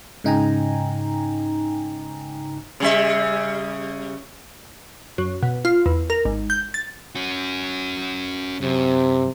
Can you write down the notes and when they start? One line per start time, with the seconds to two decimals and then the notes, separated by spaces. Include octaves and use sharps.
0.24 G#2 C#3 D#4 G5 G#5 A#5
2.80 C#3 G3 E5
5.18 F#2
5.43 B2
5.65 F4
5.86 E2
6.10 A#4
6.25 G#1
6.50 G6
6.74 A6
7.15 C#4 F#4
8.61 F#2 C3